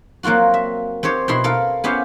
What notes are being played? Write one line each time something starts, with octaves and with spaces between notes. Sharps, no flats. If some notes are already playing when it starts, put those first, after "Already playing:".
F#3 A#3 C4 F4 F#4
E5
C4 G4 C5 C#5
B2 E4 C6
A4 A#4 F5
B3 C#4 E4 G4 C5 F5